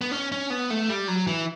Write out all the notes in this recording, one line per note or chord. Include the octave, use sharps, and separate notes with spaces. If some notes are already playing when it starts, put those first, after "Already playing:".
B3
C#4
C#4
B3
A3
G3
F#3
E3